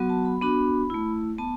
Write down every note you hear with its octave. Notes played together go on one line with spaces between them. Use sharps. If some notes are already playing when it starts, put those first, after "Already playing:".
Already playing: F#3 B3 F#4
A5
B5
B3 D4 F#4 B5
A3 E4
B3 A5